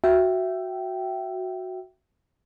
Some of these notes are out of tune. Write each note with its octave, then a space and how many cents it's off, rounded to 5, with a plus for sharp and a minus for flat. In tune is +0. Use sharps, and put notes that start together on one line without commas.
F#4 +0 E5 +15 G5 -15